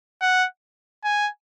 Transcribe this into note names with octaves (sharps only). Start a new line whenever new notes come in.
F#5
G#5